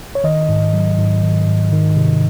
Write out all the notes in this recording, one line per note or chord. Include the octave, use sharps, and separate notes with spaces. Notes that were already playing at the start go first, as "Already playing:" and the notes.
C#5
D#3 D#5
G#2
F#3
G#2
D#3
G#2
D#3
C3